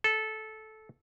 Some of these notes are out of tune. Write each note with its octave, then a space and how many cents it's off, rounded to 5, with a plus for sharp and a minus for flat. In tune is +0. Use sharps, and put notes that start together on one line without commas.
A4 -15